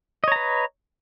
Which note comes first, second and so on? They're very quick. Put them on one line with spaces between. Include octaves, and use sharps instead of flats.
D#5 C#5 A#5 B4